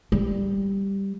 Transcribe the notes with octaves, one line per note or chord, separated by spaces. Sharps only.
G3